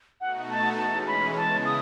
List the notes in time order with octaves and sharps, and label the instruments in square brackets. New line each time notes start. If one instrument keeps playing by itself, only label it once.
[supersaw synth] B2 A3 D#4 F#4 [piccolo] F#5
[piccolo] A5
[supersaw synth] E3 G#3 C#4 [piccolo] A5
[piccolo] B5
[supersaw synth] C#3 G#3 B3 E4 [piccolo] A5
[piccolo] D#6